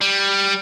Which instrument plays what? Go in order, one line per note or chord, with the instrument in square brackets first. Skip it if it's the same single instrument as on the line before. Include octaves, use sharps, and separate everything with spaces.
[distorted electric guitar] G3